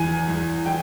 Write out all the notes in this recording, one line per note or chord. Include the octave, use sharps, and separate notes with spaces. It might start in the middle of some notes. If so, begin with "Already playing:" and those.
Already playing: E2 E3 G#5
E2 E3
E3 G5